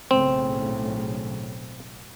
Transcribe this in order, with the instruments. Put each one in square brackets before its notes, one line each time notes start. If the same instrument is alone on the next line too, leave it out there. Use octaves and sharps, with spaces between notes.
[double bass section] B1 A2 C#3 [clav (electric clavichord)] C4